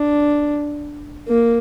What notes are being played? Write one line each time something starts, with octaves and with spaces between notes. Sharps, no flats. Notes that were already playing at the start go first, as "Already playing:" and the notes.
Already playing: D4
A#3